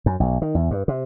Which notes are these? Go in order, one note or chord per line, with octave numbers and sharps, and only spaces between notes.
F#2
B1
D#3
E2
G2
C3